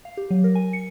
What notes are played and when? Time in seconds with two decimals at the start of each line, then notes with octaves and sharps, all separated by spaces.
0.05 F5
0.17 G4
0.31 F#3
0.44 A#4
0.55 G#5
0.73 C#7